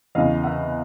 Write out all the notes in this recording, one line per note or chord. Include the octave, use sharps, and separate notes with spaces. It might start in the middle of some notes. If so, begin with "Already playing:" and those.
E2 C#3 E3 D#5 F5
E5 F#5